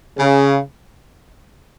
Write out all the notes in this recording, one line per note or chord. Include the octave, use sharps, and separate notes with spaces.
C#3